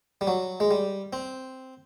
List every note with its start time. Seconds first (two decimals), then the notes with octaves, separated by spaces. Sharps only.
0.21 G3
0.27 F#3
0.60 G#3
0.71 G3
1.13 C4